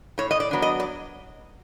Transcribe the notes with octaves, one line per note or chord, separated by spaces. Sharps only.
A2 C#5
D#5
D5
F#3 B3 D4
D#5
D5